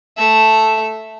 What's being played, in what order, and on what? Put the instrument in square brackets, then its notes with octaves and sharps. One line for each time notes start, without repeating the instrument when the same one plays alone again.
[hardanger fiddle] A3 E5